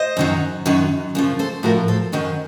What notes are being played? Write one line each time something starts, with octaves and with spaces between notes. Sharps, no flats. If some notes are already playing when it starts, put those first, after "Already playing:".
Already playing: C5 D#5
F#2 D#3 F#3
F#2 D#3 F#3
F#2 C#3 F3
A4 C5
A2 F3 F#4 A#4
A4 C5
F#2 D#3 F#3 C5 D#5